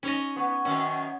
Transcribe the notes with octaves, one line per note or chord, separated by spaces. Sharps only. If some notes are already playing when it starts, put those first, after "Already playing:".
C#4 D#4 C#5 D#5
B3 C#6
F#2 D#3 F#3 C#4